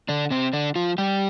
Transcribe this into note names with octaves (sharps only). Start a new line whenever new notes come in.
D3 D4
C3 C4
D3 D4
F3 F4
G3 G4